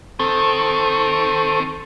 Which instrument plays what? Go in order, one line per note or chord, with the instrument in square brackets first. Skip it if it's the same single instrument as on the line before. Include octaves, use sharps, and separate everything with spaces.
[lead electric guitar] D#3 [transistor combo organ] C4 A4